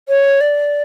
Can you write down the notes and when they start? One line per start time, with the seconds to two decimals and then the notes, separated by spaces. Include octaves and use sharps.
0.09 C#5
0.41 D5